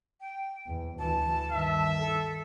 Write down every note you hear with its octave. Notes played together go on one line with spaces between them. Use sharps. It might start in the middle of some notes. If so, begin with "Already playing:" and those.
G5
E2
D2 E3 A5
G2 D#3 E5
A4